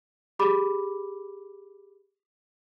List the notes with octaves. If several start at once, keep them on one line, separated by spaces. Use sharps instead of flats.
G4 G#4 B5 D6